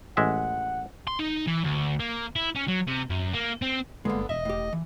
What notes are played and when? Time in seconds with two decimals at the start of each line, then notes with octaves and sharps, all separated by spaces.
0.17 A1 G#3 E5 F#5
1.08 C6
1.19 D#4
1.48 E3
1.64 D2
1.99 A#3
2.36 E4
2.56 C#4
2.68 F#3
2.88 C3
3.10 F#2
3.34 A#3
3.62 C4
4.05 G1 D3 G#3 A#3 B3
4.29 E1 D#5 E5
4.45 A2 G4
4.73 E3